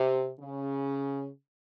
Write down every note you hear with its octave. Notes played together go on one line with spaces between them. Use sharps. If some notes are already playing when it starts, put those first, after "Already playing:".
Already playing: C3
C#3